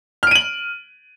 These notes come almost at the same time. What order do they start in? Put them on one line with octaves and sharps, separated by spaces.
F6 D7 D#7 F#7